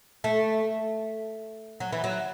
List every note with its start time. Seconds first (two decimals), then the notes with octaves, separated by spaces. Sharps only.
0.24 A3
1.80 F#3
1.92 E3
2.04 F#3